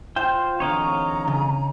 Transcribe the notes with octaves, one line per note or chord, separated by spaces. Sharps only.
F4 C5 G5
D3 E3 C4 C#5 D#5 F5 A#5
C#3